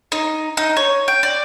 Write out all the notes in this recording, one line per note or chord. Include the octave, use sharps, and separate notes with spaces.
D#4
D#4
C#5
G5
D5